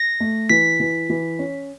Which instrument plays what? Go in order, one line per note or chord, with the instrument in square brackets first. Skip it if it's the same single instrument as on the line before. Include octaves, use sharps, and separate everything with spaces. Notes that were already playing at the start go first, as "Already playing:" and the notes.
Already playing: [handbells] A#6
[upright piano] A3
[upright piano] E3 [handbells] B6
[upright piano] E3
E3
C#4